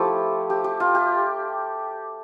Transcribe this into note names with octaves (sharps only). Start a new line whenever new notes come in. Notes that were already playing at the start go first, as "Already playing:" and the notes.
Already playing: F3 A3 E4 G4
G4
G4
F4
G4